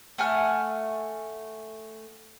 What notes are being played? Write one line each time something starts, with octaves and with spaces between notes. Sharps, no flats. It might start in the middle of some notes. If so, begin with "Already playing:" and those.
A3 F#5 G#5 F6